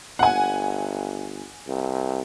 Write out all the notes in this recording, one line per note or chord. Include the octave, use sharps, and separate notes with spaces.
G1 F#5 G#5
C2